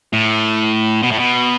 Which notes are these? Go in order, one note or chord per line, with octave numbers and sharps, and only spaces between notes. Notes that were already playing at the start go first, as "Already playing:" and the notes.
A2
B2
A2
B2